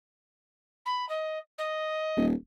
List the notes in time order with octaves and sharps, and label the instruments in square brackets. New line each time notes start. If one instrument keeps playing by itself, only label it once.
[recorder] B5
D#5
D#5
[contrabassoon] D#1